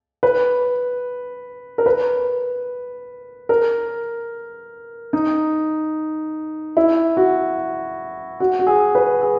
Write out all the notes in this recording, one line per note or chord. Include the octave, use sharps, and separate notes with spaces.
B4
A#4
B4
A#4
D#4
E4
F#4
F#4
F#4
G#4
B4
G#4